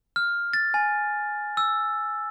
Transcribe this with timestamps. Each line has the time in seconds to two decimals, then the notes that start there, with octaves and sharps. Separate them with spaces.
0.16 F6
0.53 A6
0.74 G#5
1.57 E6